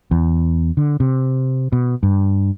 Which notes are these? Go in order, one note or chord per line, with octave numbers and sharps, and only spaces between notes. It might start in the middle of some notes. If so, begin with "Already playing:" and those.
E2
D3
C3
B2
G2